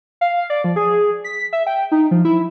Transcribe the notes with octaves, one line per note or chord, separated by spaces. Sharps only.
F5
D5
F3
G#4
B6
E5
G5
D#4
F3
E4